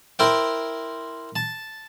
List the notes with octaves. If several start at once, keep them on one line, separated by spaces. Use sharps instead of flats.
E4 A#4 C5 G5
A5